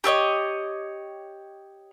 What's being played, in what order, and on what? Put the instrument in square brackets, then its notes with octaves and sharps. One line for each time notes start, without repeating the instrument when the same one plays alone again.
[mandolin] G4 A4 C#5 D#5